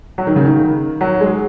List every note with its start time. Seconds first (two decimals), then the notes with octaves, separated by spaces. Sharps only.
0.18 F#3
0.27 D#3
0.36 C#3
0.45 D#3
1.01 F#3
1.21 G#3